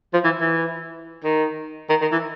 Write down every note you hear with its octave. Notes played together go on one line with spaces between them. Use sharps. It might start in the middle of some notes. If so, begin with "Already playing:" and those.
F3
E3
E3
D#3
D#3
D#3
E3